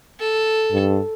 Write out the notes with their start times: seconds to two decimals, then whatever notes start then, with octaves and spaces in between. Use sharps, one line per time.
0.20 A4
0.72 G2